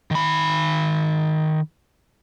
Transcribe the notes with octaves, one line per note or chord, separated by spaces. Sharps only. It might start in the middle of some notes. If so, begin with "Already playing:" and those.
D#3 B5